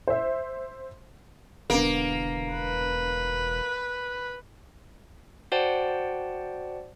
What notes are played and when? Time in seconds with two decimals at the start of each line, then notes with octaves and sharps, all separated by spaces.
0.07 C5 E5
1.70 E1 D3 A#3 B3
2.53 B4
5.52 F#4 C5 D5 F#5 G5 A5